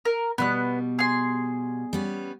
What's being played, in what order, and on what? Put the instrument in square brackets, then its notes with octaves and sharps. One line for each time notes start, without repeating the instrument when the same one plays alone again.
[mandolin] A#4
[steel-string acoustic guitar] B2 G3 [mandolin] B3 F#6
[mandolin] G#4 C6
[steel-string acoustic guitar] G3 B3 C#4